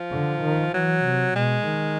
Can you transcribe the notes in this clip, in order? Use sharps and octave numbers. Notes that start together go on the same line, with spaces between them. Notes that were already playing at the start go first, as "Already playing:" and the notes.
Already playing: F3
D3
D#3
E3 F#3
C3
B2 G#3
D#3